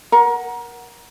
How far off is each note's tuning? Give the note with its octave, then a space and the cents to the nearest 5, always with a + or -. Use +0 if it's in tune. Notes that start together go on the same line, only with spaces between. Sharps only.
A#4 +25 F#5 +0